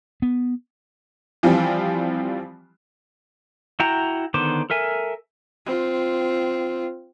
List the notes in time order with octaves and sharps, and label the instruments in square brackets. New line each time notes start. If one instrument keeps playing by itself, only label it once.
[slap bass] B3
[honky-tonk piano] E3 F3 G3 C4
[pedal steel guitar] E4 F#4 F#5 G5 A#5
D3 D#3 B3 C5 D6
A4 A#4 E5 G#5
[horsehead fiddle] C4 F4